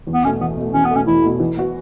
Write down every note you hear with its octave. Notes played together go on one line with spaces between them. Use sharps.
E2
B3
B2 A3 C#4
E2 B3
B2 A3
E2 C#4
B3
B2 A3 C#4
E2 E4
B2 A3
E3
B3 F#4